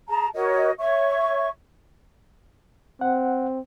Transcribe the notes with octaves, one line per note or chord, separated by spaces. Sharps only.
G#4 A5 A#5
F#4 A#4 C#5 D#5
C#5 E5 C#6
C4 F#5